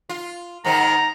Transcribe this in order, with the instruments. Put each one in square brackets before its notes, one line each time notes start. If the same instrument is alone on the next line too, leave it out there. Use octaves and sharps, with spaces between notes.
[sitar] F4
[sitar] G#2 D#3 C4 [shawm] A#5